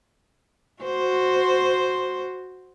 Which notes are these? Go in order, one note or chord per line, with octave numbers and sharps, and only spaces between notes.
F#4 C5